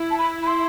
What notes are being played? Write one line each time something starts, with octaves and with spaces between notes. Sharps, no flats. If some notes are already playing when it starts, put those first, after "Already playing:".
Already playing: E4
A5
B5
B5
C6